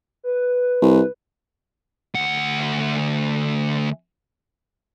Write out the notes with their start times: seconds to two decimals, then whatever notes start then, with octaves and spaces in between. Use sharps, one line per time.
0.24 B4
0.82 C2
2.15 D2 F#5